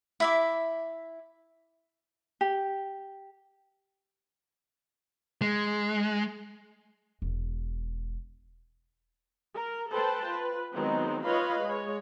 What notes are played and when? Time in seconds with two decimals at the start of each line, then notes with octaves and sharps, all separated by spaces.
0.20 E4 E5 D6
2.41 G4
5.42 G#3
7.22 E1
9.55 A#4
9.92 A4 B4 C5 G5 A5
10.26 F4 B4
10.74 D#3 F#3 G#3 B3 C4 D#4
11.26 F4 B4 C#5 D#5 F5 B5
11.62 G#3 C#5